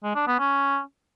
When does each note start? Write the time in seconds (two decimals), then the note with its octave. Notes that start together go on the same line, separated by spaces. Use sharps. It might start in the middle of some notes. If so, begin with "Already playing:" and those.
0.03 G#3
0.15 D4
0.27 B3
0.39 C#4